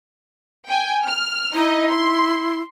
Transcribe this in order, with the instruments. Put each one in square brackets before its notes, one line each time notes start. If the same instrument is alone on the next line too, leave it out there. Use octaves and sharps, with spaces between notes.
[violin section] G5 G#5
F6
[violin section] D#4 D#5 [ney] E4
[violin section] C6